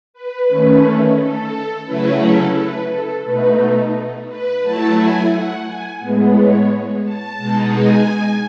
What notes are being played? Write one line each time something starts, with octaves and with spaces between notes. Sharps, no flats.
B4
D#3 A3 C#4
A4
C#3 F#3 A3 C#4 E4 B4
A4
B4
A4
B2 A3 D#4 B4
B4
F#3 A3 E4 A5
G#5
F#5
G#5
A2 G#3 B3
C#5
A5
B2 G#3 D#4
G#5